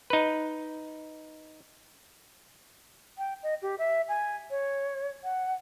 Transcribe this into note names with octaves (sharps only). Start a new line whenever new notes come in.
D#4 B4
G5
D#5
G4
E5
G#5
C#5
F#5